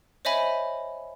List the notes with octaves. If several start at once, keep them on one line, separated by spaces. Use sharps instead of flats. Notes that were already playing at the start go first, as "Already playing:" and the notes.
C5 C#5 D#5 E5 G#5 B5